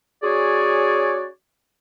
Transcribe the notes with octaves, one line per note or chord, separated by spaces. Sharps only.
C#4 F#4 G#4 C#5 D5